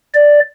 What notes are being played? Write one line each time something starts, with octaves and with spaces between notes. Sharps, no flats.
D5